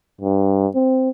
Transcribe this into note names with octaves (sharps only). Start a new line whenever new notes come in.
G2
C4